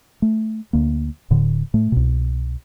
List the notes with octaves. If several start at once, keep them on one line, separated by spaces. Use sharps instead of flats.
A3
D2 A#3
D1 A2 D3
A2 A3
C2 B2